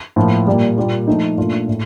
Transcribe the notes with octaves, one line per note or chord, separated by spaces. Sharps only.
A2 F3 A#3 F4
A#2 G3 A#3
A#2 G3 A#3 F4
F3 A3 D#4
A#2 A3 D4 F4
A2 A3